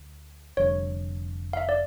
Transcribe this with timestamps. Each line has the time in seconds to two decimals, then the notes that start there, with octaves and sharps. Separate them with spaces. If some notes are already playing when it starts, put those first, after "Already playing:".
Already playing: D2
0.57 F1 F2 D3 G3 C#5
1.53 F5
1.57 E5
1.69 D5